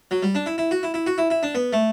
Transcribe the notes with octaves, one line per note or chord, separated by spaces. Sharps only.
F#3
G3
D4
E4
E4
F#4
E4
E4
F#4
E4
E4
D4
B3
A3